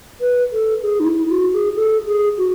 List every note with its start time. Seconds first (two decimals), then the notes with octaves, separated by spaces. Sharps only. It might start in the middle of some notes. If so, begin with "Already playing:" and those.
0.21 B4
0.52 A4
0.83 G#4
1.00 D#4
1.06 E4
1.29 F#4
1.53 G#4
1.76 A4
2.07 G#4
2.38 F#4